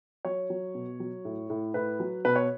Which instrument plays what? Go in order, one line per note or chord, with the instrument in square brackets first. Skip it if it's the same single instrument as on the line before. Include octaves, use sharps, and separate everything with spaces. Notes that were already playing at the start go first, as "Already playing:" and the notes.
[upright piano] F#3 C#5
F#3
B2
F#3
A2
A2
A2 B4
F#3
B2 B4
C#5